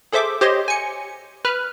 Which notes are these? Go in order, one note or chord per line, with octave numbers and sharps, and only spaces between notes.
G#4 A4 C5 E5 D6
G4 C5 C#5 D#5 C6
G#5 C#7
B4 B5 F6 F#6